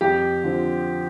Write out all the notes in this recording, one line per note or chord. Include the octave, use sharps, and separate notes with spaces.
F2 G4
D3 F3 C4